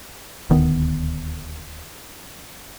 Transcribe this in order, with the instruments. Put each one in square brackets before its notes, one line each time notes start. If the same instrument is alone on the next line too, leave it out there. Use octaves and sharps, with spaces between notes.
[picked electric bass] D#1 D2 D#3 B3